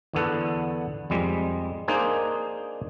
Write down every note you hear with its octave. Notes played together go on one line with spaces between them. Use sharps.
E2 D3 B3 A4 F#5
F2 G3 G#3
A#3 D4 D#4 G#4 C5 G#5